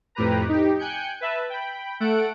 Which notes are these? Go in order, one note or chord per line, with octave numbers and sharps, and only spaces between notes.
F2 A2 G4 B4 A#5
D#4 G4
G5 G#5 F#6 G6 C#7
B4 E5 A5
G5 B5
A3 A4 F#5 D7